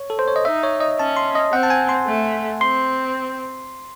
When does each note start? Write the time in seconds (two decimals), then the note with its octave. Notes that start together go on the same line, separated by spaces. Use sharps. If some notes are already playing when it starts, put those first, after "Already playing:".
Already playing: C#5
0.10 A4
0.19 C5
0.28 C#5
0.36 D#5
0.45 D#4 E5
0.63 C#5
0.81 D#5
0.99 C#4 A5
1.17 C6
1.35 D#5
1.52 C4 F#5
1.63 A5
1.70 G#5
1.89 C6
2.07 A3
2.61 C4 C6